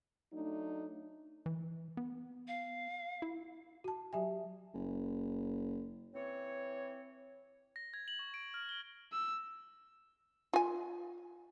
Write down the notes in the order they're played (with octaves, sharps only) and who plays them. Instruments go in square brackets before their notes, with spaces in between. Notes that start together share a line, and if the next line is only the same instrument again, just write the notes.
[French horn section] F#3 A3 D4 D#4
[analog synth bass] E3
B3
[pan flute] F5
[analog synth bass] E4
[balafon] F#4 A5
F#3 G4 E5 G#5
[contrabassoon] F#1
[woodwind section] E3 C4 C#5
[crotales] A#6
G#6
F#7
C#6
D7
F6
G7
[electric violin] E6
[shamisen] F4 G#5